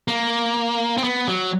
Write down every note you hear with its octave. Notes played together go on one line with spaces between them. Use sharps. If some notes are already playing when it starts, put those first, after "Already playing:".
A#3
C4
B3
F#3